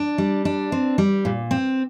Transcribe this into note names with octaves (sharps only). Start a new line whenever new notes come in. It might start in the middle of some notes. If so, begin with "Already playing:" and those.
Already playing: D4
G3
D4
C4
G3
A#2
C4